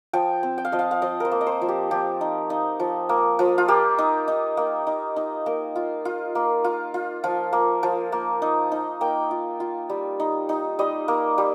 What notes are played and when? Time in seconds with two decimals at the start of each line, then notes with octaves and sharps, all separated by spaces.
0.13 F3 G5
0.43 C4
0.58 G5
0.65 F5
0.72 F3 D#5
0.79 F5
0.91 F5
1.02 F3 D#5
1.20 A#4 C5
1.31 A#3
1.41 D#5
1.47 C5
1.62 F3
1.68 G4
1.91 F3 G4
2.21 D#4
2.50 D#4
2.80 F3
3.09 A#3
3.39 F3
3.58 F4
3.68 A#3 G4
3.98 D#4
4.28 D#4
4.57 A#3
4.87 D#4
5.16 D#4
5.46 A#3 A#4
5.76 F4
6.05 F4
6.35 A#3
6.64 F4
6.94 F4
7.24 F3 F4
7.53 A#3
7.83 F3
8.12 A#3
8.42 D#4
8.72 D#4
9.01 A#3 G5
9.31 F4
9.60 F4
9.89 G3
10.20 D#4
10.49 D#4
10.79 G3 D#5
11.08 A#3
11.38 G3